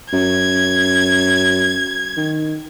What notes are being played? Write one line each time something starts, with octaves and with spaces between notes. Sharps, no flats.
F#2 G#6
D#3